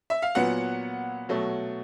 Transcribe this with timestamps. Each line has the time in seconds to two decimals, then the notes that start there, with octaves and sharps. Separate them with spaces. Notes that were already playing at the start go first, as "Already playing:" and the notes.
0.10 E5
0.22 F5
0.35 A#2 F#3 B3 F#5
1.29 B2 F#3 A3